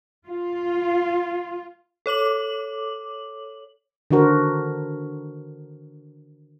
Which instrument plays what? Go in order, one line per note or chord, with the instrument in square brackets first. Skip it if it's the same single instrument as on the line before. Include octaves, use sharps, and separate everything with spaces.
[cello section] F4
[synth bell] A4 C#5 D6 F#7
[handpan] D3 D#3 D4 F#4 A#4 C5